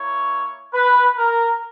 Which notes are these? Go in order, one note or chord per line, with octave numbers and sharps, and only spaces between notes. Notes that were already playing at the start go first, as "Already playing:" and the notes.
Already playing: A#3 E4 C#5
B4
A#4